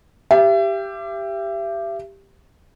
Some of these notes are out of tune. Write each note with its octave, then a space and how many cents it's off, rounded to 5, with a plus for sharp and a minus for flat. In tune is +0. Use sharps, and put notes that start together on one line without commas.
G4 +5 E5 +35